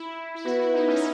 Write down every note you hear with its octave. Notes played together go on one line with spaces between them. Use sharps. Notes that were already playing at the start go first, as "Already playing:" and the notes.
Already playing: E4
E4
B3 F#4
E4
D#4
C#4
D#4